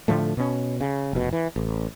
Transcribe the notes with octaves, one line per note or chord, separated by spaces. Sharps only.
A2 D3 F3 A3
B2 C#4
C#3
F1 B2
E3
A1